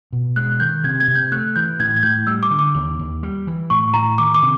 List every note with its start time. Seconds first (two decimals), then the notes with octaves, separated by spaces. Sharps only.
0.13 B2
0.36 G#3 F#6
0.60 D#3 G6
0.84 C3 G#6
1.00 G#6
1.08 C3
1.15 G6
1.32 A3 F#6
1.56 E3 G6
1.79 A2 G#6
1.97 G#6
2.03 A2 G6
2.27 G3 E6
2.43 D6
2.51 D3
2.59 D6
2.75 D#2
2.99 D#2
3.23 G3
3.47 E3
3.70 A2 C#6
3.94 A2 A#5
4.18 D#3 D6
4.34 D6
4.42 C3